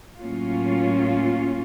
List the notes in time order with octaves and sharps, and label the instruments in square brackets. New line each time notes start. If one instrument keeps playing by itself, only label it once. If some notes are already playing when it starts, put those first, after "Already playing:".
[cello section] A2 F#3 A#3 C#4 F4